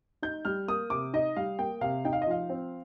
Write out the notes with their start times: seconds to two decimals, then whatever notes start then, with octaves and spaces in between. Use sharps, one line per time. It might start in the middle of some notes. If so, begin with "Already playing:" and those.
0.22 D#4 G6
0.45 G3 F6
0.68 A#3 D#6
0.90 C3 D6
1.14 D#4 D#5
1.37 G3 F5
1.59 A#3 G5
1.81 C3 F5
2.05 D#4 G5
2.13 F5
2.22 D#5
2.27 F3 F5
2.49 C4